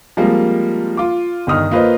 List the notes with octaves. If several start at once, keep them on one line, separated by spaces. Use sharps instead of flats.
F3 G3 G#3 A#3 C4
F4 D6
G1 D#3 D#6 F6
A#3 F4 B4 C5 D#5